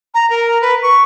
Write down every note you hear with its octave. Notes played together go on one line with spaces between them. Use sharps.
A#5
A#4
B4
C#6